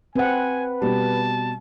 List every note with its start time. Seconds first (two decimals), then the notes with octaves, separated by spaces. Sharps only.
0.16 C4 B4 F#5 G#5
0.82 B2 G3 A5